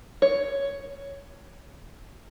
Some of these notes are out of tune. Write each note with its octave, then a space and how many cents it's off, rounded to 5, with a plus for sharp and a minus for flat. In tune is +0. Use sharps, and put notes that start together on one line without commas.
C#5 +5